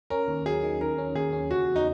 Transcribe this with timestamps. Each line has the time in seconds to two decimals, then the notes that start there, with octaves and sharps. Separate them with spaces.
0.10 C#4 A#4
0.28 D#2
0.46 F#3 G#4
0.63 D#3
0.81 D#3 A#4
0.98 C#4
1.15 D#2 G#4
1.33 C#4
1.51 C#3 F#4
1.68 E2
1.76 D#4